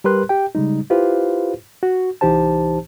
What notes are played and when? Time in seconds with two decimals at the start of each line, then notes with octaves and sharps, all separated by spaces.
0.04 G3 G4 A#4 B4 C6 F#6
0.29 G4 G5
0.55 C#3 G3 G#3 D#4
0.90 E4 F4 G4 B4 C5 F5
1.83 F#4
2.21 C2 E3 D#4 G4 C5 A5